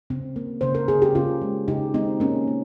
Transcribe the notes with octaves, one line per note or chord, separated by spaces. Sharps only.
C#3 C4
A#3
C#3 C5
A#4
C#3 G#4
G4
C#3 C#4 F4
G#3
C#3 D#4 G4
G#3 C4 D#4
A#3 C#4
A#3